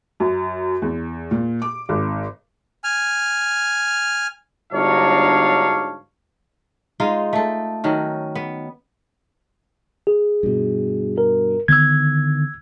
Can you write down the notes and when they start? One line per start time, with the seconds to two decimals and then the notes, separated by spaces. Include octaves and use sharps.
0.20 F#2
0.82 E2
1.31 A#2
1.62 D6
1.89 G#1
2.84 G#5 F6
4.73 G1 G#2 F#3 D4 C#5 F5
7.00 G#3 D#4 F4
7.33 A3 A4
7.84 D#3 F#3 C#4
8.35 B3
10.07 G#4
10.43 G2 B2
11.18 A#4
11.68 D3 D#3 B3 E6 G#6